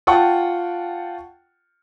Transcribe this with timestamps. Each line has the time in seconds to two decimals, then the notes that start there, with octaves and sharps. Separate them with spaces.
0.07 F4 F#5 G5 A5 C#6